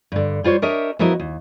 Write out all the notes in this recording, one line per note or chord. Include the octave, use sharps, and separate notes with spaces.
G2 D3
G3 F4 C5 C#5
D4 G4 A#4 C#5 D#5 E5
F3 B3 E4 F#4 A#4 D#5
D#2